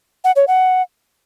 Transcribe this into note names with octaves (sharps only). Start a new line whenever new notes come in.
F#5
C#5
F#5